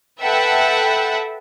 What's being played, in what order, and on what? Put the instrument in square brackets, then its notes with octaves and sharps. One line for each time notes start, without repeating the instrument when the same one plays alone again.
[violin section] A4 B4 E5 F#5 G5